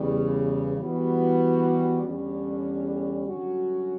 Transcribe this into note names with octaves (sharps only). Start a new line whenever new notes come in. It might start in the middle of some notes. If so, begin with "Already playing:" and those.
Already playing: E2 C#3 G3
E3 G3 B3 F#4
E2 D3 G3 C#4
G2 D3 F#3 C#4 F#4